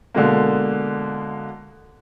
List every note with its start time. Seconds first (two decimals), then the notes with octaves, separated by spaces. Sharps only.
0.15 B2 D3 G#3 A#3